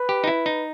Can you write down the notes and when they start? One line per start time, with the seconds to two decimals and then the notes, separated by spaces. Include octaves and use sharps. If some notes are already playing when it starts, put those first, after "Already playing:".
Already playing: B4
0.09 G4
0.24 D#4
0.27 E4
0.46 D#4